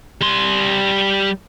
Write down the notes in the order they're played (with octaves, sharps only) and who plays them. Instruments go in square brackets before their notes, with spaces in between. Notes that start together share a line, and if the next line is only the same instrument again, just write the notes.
[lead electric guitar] G3 C6